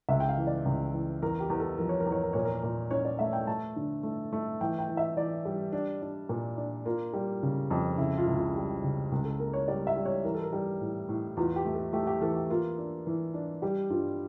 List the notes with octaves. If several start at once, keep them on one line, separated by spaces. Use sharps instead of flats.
C#2 E5
G5
F5
E3
D5
C#2
E3
E2 A#4
G4
E2
A4
F3 A#4
C#5
A#4
E2
C#5
A#4
A#2 C#5
A#4
A#2
C#4 C#5
D5
A3 E5
G5
A3 A5
D3
A3
A3
E3 G5
G5
E3
E5
E3 D5
G3
D4
D4
A#2
D4
A#3 F4
G3
C#3
F2
C#3 E4
F4
C#2 E4
F4
G3
C#3
C#2
A4
A#3 A#4
C#5
G3 D5
E5
G3
C#5
E3 A#4
A4
A#4
G3
A2
A2
E2 F4
G4
A3
A4
A3 G4
G4
E3 A4
G4
A#3 F4
D4
E3
D4
G3 G4
G2 F4